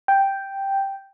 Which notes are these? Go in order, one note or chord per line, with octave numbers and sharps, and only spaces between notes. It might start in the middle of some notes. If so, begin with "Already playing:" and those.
G5